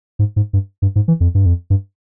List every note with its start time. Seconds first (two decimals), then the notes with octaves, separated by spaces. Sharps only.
0.19 G#2
0.36 G#2
0.53 G2
0.82 G2
0.96 G#2
1.08 E3
1.20 F2
1.35 G2
1.46 F2
1.70 G2